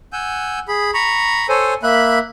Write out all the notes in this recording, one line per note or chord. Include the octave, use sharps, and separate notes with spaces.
F#5 G#5 E6 G6
G#4 B5
A#5 B5 C#6
A4 C5 C#5 G#5
A#3 E5 B5 F#6